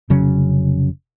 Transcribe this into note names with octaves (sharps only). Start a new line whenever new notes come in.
F1 C#3 F#3 C#4